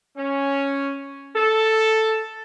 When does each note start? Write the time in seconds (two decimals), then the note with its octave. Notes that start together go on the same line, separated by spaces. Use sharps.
0.17 C#4
1.35 A4